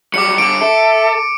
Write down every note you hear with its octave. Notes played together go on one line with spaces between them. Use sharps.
F#3 G3 D6 C#7
D3 G3 D6 D7
A4 E5